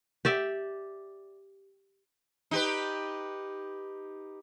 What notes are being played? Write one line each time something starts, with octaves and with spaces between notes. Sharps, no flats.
G4 D5 E5
D#4 G4 B4